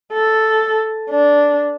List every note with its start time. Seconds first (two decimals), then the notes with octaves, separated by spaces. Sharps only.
0.13 A4
1.10 D4